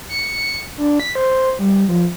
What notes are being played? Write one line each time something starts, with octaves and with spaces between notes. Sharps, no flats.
C#7
D4
B6
C5
G3
F3